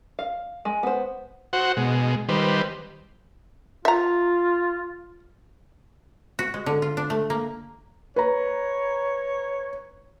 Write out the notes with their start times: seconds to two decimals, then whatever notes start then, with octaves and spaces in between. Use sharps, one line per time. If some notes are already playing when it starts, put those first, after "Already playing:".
0.19 F5
0.65 G#3
0.83 B3 C5
1.53 F#4 C5 F#5
1.77 B2 G#3
2.29 D#3 G3 B4 C5
3.85 F4 E5 A#5
6.39 F#4
6.54 G#3
6.66 D3
6.82 F4
6.97 D4
7.10 A3
7.30 A#3
8.16 B4 C#5 A#5